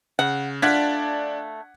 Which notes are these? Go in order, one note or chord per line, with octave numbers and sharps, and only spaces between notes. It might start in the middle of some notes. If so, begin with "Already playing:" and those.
C#3 F#5
A3 D4 F4 D5 F#5 F#6 G#6 B6